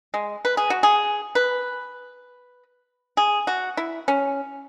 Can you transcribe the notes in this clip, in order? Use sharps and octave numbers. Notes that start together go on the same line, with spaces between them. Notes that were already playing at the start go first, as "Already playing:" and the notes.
G#3
B4
G#4
F#4
G#4
B4
G#4
F#4
E4
C#4